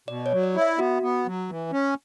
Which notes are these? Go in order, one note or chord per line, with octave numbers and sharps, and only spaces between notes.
B2 D5
C#5
F#3
D5
E4
E5
B3 F#4
B3
F#3
E3
C#4